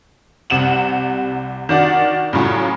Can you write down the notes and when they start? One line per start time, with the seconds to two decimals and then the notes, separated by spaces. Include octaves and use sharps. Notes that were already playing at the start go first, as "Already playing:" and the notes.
0.50 C2 C3 F#5 E7 F#7
1.69 D#3 D4 F#4 D5
2.33 A2 C#3 F#3 C#4 F4